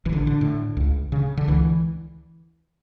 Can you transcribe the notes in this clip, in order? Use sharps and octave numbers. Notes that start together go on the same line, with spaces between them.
A1 E3
D3
D3
A2
C#2
C#3
D3
C#2 E3